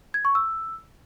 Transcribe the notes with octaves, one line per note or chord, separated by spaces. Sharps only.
G#6
C#6
E6